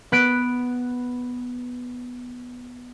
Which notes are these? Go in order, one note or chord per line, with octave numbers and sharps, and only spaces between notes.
B3 F#6 B6 D7